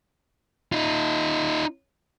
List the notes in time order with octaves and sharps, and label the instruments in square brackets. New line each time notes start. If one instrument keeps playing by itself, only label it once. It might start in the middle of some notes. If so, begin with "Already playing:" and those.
[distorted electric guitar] D#4 F4